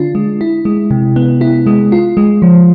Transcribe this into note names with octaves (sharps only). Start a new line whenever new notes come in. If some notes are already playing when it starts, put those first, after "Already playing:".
Already playing: D3 D4 F4
G#3
E4
G#3
C3
B3
E4
G#3
F4
G#3
F3